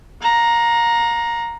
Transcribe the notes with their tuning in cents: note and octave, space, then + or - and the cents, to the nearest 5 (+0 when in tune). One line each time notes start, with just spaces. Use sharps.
F5 +45 A#5 +0